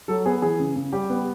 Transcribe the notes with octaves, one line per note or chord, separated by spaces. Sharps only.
F#3 A4
B3 G#4
E3 G#4
C#3
C#3
G3 G4
B3